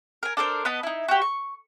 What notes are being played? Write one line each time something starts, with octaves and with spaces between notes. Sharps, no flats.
A#4 G#5
D4 A4 A#4 C5
B3 B4 D#5 A5
D#4 E4
F#4 G4
C#6